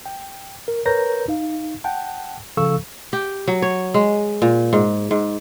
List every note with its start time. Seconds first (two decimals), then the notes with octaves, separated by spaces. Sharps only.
0.06 G5
0.68 A#4
0.86 A#4 B4 C#5 A#5 G6 A#6
1.28 D#4 F5
1.84 F#5 G5 A5
2.57 C#3 F3 A4 F5 C#6 E6
3.13 G4
3.48 F#3
3.62 C#5
3.94 G#3
4.42 A#2
4.73 G#2
5.11 G#2